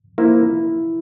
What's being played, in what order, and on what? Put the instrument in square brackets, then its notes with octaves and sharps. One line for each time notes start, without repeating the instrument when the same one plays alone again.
[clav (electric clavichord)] A#3 F4 C5 [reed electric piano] E4